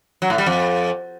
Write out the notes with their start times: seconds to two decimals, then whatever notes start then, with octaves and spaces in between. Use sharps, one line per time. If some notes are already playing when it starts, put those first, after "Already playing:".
0.22 F#3
0.30 A2
0.38 G3
0.47 F2